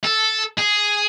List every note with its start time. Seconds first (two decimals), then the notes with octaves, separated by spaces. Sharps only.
0.04 A4
0.58 G#4